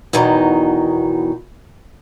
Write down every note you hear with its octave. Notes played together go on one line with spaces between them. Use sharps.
E2 B2 D#3 F#3 D#4